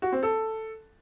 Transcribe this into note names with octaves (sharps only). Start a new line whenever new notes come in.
F#4
C4
A4